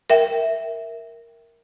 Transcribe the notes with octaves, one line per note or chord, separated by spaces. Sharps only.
A#4 E5 G5